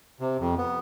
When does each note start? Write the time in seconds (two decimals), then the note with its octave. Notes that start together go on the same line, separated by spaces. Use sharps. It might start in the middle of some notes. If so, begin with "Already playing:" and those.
0.20 C3
0.40 F2
0.58 B3